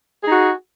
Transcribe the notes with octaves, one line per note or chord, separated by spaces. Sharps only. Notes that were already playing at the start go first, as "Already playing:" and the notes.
D#4 F#4 G#4